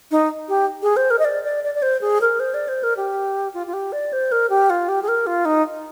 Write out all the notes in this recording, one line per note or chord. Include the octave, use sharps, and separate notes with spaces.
D#4
G4
G#4
C5
A#4
D#5
D5
D5
D5
D5
C5
G#4
A#4
C5
D5
C5
A#4
G4
F4
F4
G4
D5
C5
A#4
G4
F4
G4
G#4
A#4
F4
D#4